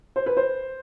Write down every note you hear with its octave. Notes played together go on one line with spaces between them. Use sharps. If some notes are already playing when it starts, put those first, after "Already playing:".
C5
B4
C5